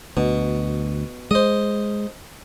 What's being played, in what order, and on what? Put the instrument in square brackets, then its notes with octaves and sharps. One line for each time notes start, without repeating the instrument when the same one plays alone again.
[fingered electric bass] D2 [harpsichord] B2
[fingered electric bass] G#3 [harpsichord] C5 D#5